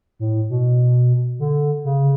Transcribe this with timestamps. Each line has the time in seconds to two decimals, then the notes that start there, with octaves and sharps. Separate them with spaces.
0.20 A2
0.50 B2
1.39 D3
1.84 C#3